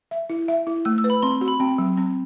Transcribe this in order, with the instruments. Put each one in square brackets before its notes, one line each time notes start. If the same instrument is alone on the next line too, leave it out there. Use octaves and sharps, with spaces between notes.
[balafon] E5
E4
E5
E4
[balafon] A3 [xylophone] E6
[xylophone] E6
[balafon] B4
[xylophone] B5
[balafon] C4 [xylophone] C6
[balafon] F#4
[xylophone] B5
[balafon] C4 [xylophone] G5
[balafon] F#3
C4